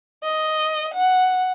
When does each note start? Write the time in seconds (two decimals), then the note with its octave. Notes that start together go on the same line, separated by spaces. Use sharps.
0.24 D#5
0.94 F#5